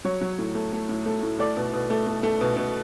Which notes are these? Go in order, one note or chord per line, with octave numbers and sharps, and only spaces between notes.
F#3 C#5
F#3
A2
A3
A3
A2
A3
A2
A3 D5
B2
B2
A3
A3
A3
B2
B2